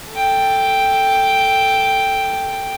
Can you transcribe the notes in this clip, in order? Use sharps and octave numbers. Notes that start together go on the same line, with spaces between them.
A4 G5